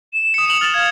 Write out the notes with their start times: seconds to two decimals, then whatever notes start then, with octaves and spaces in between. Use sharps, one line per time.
0.13 E7
0.34 D#6 C#7
0.46 C#7 F7 F#7
0.61 F6 A6 E7
0.74 F5 G#6